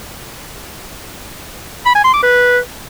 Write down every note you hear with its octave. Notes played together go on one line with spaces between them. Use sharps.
B5
G#5
C6
D6
B4